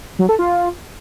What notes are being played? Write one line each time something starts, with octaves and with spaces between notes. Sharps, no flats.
F#3
A4
F4